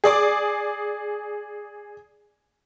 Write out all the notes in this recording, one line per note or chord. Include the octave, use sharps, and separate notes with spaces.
G#4 D5 D6